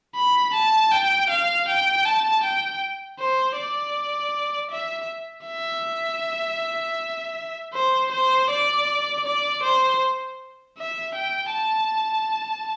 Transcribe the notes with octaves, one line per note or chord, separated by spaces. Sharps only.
B5
A5
G5
F5
G5
A5
G5
C5
D5
E5
E5
C5
C5
D5
D5
C5
E5
G5
A5